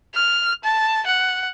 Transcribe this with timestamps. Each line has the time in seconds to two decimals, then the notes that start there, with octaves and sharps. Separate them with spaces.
0.15 F6
0.64 A5
1.06 F#5